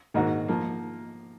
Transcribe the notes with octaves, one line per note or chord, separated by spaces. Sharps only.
G#2 D#3 A#3 D#4 F#4
F3 A#3